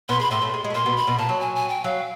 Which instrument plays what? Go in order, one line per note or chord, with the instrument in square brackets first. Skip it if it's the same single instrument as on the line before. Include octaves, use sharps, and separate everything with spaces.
[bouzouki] B2 B3 [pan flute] C6
[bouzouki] G#3 [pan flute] B5
[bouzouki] A2 A3 [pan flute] C6
[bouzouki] A2 A3
G#3
G#3
A3
[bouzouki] A#2 A#3 [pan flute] C6
[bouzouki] B2 B3
[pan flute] B5
[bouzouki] B2 B3
[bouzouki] A#2 A#3 [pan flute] A5
[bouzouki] F#3
[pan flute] G#5
G#5
G5
[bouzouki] F#3 [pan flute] F5